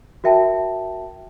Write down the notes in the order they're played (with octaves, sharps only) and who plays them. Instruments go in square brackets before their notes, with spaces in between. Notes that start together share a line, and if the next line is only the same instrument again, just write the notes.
[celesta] F#4 A#4 E5 G5 A5